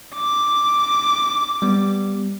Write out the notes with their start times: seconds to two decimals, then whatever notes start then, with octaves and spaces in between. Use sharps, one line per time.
0.15 D6
1.62 G3 B3